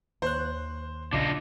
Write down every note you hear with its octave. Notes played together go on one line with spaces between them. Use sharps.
D#2 D#3 C5 C#5 F#6
A#1 C#3 D4 F4 D#5